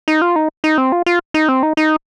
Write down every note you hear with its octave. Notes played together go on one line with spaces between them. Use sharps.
D#4
F4
D#4
D#4
C4
F4
F4
D#4
C4
D#4
D#4